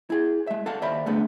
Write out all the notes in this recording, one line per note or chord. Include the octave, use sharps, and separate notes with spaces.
E4 G#4
G#3 E5
A4 F5 F#5 A5
D#2 C5 D5 E5 B5
D3 G#3 A3 B3